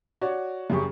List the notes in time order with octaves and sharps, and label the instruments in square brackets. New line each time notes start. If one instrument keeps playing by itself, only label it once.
[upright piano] F#4 C#5 D5
F#2 C#3 G4 G#4 C#6